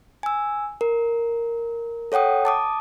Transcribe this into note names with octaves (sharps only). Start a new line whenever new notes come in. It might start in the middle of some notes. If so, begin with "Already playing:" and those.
G#5 E6
A#4
A4 C#5 F#5 G5 D#6
A5 D6 D#6